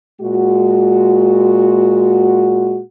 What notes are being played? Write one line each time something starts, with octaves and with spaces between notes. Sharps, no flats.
A#2 G#3 F#4